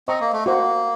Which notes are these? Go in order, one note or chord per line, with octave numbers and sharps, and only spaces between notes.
C4 C5 D#5 A#5 C#6
A#3
A3
A#3 F#4 C5 F#5